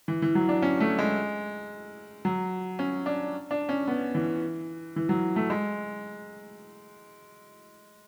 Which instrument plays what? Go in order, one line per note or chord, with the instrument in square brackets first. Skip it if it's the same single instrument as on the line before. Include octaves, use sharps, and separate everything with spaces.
[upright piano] E3
E3
F#3
D4
C#4
A3
G#3
F#3
C#4
D4
D4
C#4
B3
E3
E3
F#3
A3
G#3